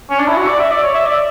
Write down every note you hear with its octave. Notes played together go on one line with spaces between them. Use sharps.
C#4
D4
E4
F#4
D5
E5
D5
C#5
E5
D5